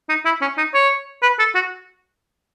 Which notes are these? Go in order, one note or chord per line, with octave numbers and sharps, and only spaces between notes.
D#4
E4
C#4
D#4
C#5
B4
A4
F#4